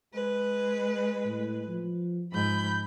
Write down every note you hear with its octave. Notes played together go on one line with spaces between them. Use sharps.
G#3 B4
A2
F3
G#2 F3 B5 G6